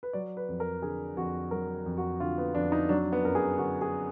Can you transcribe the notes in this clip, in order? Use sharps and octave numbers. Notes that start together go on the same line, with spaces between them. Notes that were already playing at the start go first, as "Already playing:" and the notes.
B4
F#3 D5
B4
F2
A#4
D3 G#4
F2 F#4
F#3 A#4
F2
F#4
D3 F4
B3
F2 D4
D#4
F#3 D4
B3
F#2 A#4
G#4
D3 F#4
G#4